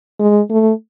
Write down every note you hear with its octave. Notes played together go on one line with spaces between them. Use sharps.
G#3
A3